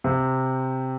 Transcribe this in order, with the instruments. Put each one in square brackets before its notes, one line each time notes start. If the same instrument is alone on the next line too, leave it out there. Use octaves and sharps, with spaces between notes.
[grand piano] C3